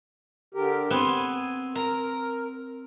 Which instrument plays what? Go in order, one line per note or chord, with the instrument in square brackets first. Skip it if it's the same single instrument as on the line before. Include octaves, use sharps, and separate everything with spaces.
[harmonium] D3 G4 A#4
[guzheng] B3 C4 [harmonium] G#5
[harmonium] A#4 [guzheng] A#5